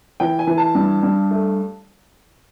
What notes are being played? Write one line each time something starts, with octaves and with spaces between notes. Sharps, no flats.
E3 G5
G#5
E3
A5
G2
G2
A3